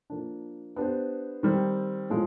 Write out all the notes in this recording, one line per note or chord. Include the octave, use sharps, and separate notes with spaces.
F3 A#3 D4
B3 D4 G4 C5
D#3 G3 C4
A2 F3 G#3